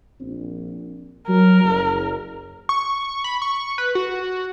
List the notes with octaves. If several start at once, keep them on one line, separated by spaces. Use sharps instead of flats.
A#1 C4
F#3 A#4
F#1
C#6
B5
C#6
B4
F#4